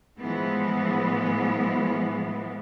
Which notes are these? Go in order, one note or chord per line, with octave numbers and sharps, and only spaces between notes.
A2 E3 F3 G#3 B3